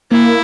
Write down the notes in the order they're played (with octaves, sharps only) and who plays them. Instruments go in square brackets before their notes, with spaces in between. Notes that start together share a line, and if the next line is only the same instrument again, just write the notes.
[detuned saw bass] A#3 [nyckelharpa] E4